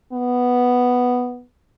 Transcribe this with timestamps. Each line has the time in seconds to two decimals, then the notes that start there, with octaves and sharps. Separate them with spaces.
0.13 B3